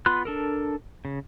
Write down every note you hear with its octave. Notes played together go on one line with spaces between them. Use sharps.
B3 F4 B5 C6 F#6
D4 A4 A#4
C#3